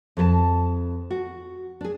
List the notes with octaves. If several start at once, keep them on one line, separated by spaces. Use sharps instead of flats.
F2 A4 A5
F#4
D4 G#4